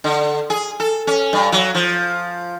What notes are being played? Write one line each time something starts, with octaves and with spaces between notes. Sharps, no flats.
D3
G#4
A4
C#4
G2
F#3
F3